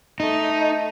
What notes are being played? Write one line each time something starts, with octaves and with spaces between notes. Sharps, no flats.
A3 D#4